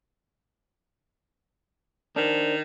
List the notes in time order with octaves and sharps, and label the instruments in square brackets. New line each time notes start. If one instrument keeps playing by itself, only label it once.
[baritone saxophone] D#3 [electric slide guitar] D4 A#4 C5